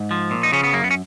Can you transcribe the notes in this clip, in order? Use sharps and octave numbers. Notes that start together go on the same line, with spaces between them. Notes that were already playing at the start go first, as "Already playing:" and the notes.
Already playing: G#2
F3
A#2
D#4
C#3 C#4
B3
F#2 A#3
B3
C#4